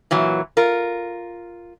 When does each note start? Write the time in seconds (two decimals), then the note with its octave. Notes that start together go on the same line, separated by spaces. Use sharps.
0.11 A#2 E3 F#3
0.57 F4 A#4